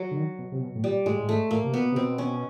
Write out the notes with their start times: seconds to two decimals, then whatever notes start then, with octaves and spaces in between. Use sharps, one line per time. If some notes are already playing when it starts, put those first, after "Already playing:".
Already playing: F#3
0.11 D3
0.16 D#3
0.39 B2
0.52 C3
0.61 B2
0.75 A2
0.84 A#2 G3
1.06 A2 G#3
1.19 A2
1.29 G#2 A3
1.51 A2 A#3
1.64 C3
1.74 B2 B3
1.92 C3
1.96 B2 C4
2.18 C#4